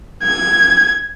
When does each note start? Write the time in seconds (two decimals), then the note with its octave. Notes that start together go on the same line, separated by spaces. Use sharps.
0.23 G#6